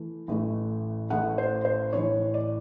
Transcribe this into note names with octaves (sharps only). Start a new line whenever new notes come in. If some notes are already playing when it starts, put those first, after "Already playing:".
Already playing: E3 A3
A1 A2 E3 A3
A1 A2 E3 A3 F#5
C5
C5
A1 A2 E3 C#5
D5